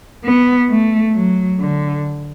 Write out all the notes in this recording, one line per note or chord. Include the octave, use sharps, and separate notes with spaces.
B3
A3
F#3
D3